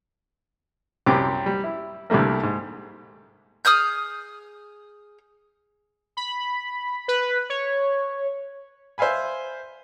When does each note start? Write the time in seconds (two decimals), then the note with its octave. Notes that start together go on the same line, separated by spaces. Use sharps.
1.06 C2 F#2 C4 G4 D6
1.46 G3
1.64 E4
2.10 C2 D3 G3 A3 A#3
2.43 G#2
3.65 G#4 D#6 F6 G6
6.17 B5
7.08 B4
7.50 C#5
8.98 C5 E5 F5 G#5 B5